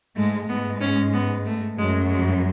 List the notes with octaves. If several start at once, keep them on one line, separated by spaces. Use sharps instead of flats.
G#2 G#3 A3
G#2 G#3 B3
C#4
B3
A3
F#2 F#3 G#3
G#3